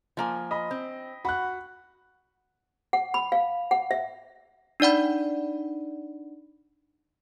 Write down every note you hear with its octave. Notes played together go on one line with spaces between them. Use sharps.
F3 A#3 G#5
D#5 B5
C4
F#4 B5 F#6
F#5
B5
F5
F#5
E5
D4 D#4 D5 F#5 B5